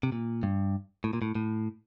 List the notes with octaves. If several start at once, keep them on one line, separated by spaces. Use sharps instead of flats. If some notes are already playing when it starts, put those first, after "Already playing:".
C3
A#2
G2
A2
A#2
A2
A2